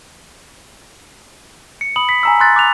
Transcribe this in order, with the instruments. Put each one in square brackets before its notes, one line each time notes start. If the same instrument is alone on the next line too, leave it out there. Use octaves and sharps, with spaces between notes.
[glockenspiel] C#7
B5 D#6 F#7
B6
G#5 A#5 E6
C6 F#6 A6
D6 F#6 F7